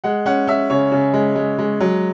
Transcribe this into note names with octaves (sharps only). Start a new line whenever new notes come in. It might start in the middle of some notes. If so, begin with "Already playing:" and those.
G#3 F#5
C#4 F#5
C#4 E5
C#3 C#5
C#3
G#3
G#3
G#3
F#3